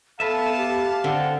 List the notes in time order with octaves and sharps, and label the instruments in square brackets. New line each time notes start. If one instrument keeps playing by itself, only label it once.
[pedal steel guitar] B3 B4 E5 [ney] A4 [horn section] F5 A5
[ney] G4
[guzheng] D3 [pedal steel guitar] C4 [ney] F#5